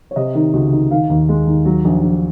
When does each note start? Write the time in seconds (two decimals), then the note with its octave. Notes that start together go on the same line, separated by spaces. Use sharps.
0.11 C#5
0.16 C3 D#5
0.35 D#3
0.54 C#2 F#4
0.73 D#3
0.91 D#3 F5
1.10 D#2
1.29 G#3
1.47 D#2
1.65 F#3
1.85 A#1
2.03 A#1